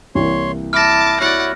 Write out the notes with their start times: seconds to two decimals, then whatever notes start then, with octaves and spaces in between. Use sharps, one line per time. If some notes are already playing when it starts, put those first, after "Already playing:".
0.15 C2 E3 A#3 C#5 C6
0.73 E4 A5 D6 F6 A#6
1.20 E4 F#4 C#5 D5 F#5